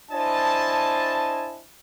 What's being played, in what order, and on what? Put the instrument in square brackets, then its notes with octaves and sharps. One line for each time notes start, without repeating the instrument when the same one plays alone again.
[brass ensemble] D4 E4 C5 D#5 G#5 A5